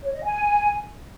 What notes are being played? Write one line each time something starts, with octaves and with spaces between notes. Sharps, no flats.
C#5
D#5
G#5